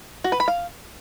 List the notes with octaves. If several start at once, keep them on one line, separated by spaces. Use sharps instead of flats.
F#4
B4
B5
F5